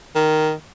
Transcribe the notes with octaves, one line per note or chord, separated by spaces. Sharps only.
D#3